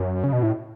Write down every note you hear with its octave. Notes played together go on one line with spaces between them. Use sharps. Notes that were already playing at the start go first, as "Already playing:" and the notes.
Already playing: F#2
C#3
B2
A2